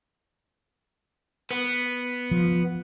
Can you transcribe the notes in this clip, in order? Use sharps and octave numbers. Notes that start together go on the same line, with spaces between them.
B3
F3